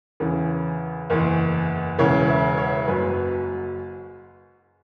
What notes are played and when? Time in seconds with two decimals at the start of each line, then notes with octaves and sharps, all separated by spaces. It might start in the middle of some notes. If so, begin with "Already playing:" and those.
0.20 E2 C#3 E3
1.10 F#1 E2 E3
1.98 E1 E2 C#3 E3 C#5
2.29 E5
2.58 C#5
2.88 F#1 F#2 F#3 B4